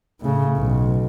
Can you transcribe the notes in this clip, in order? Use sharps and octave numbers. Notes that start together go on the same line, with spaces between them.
A2 C#3
B1